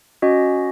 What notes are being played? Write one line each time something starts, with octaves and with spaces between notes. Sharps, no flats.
C#4 F#4 D#5